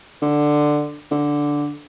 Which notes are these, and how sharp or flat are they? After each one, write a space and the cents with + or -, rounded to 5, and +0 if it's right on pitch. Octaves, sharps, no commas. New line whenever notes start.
D3 +10
D3 -5